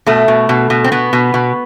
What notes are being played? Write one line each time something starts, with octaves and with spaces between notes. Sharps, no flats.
B2 A3
B2
B2
B2
C4
B2 B3
B2
B2